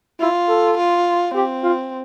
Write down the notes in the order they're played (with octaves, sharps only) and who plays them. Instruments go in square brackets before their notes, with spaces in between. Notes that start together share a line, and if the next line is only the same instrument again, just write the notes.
[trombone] E4 [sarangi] F4
[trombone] A4
[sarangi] F4
[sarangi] C4 [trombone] G4
[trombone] F4